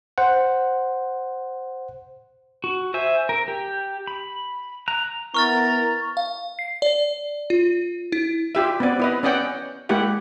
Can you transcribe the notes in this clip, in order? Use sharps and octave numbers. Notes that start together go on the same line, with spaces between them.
C5 F#5
F#4
C5 E5 G#5
A#4
G4
B5
A#5 F#6
B3 E4 A#4 A#5 C#6 F6 A6
F5
C7
D5
F4
E4
F4 G4 E5
B3 C4 D5
E4 B4 D#5
C#4 B4 D5 D#5 F#5 G5
G#3 A#3 E4 G4 F#5